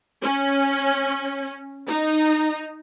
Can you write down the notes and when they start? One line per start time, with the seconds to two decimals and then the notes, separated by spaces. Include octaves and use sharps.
0.22 C#4
1.87 D#4